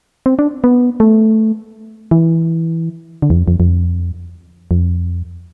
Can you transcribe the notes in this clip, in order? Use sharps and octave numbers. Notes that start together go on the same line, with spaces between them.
C4
D4
B3
A3
E3
D3
E2
F2
F2
F2
F2